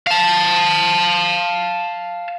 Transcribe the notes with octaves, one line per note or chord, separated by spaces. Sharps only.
F5 A5